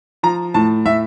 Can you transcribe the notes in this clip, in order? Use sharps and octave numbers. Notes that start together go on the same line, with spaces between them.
F3 A#5
A2 A5
A2 E5